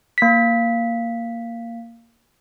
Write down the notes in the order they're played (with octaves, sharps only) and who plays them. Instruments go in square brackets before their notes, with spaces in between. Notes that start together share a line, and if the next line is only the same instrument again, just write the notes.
[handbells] A#3 B6